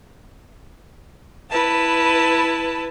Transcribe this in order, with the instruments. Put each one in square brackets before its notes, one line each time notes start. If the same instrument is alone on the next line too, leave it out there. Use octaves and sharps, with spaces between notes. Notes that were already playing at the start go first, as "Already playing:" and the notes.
[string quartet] E4 B4 A5